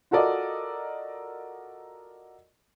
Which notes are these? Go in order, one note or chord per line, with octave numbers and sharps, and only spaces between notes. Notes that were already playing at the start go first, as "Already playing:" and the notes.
F4 F#4 A4 A#4 D5 D#5